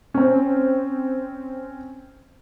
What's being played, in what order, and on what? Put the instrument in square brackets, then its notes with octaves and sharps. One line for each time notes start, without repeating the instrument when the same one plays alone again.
[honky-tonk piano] C4 C#4